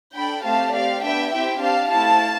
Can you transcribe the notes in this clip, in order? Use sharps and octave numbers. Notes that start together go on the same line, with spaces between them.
D4 A4 G5 B5
A3 C4 G4 F5 A5
C4 G4 D5 F5
B3 D4 G4 E5 G5
C4 E4 G4 E5 G5
D4 G4 F5 A5
A3 C4 E4 G4 F5 A5